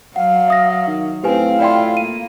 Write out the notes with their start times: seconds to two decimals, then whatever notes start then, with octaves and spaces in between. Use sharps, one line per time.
0.16 F#3 F5 F#5
0.48 E5 D#6 A#6
0.87 D#3
1.24 A2 C4 G4 B4 F5 G#5
1.60 E4 F4 D5 G5 C6
1.97 A#3 D#7